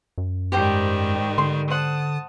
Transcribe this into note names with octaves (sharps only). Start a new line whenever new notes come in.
F#2
G#2 D#3 G3 G4 C5 G5
D3 C6
C5 F#5 A5 D#6